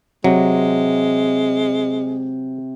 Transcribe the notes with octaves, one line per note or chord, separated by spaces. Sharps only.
C3 F#3 G#3